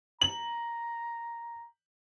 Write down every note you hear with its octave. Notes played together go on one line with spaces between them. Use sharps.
A#5 F#7